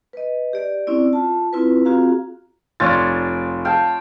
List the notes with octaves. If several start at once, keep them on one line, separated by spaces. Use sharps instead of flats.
B4 D#5
G4 D5
C4 C#4 E4 D5
F4 A5
C4 E4 F4 B4
C4 F4 F#4 G#4 F5 A#5
F1 F4 C#5 D5 A6
F5 G5 A5